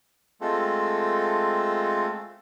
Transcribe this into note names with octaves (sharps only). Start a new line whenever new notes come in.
G#3 A3 C4 F4 A4